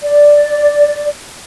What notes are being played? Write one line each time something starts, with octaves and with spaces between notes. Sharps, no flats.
D5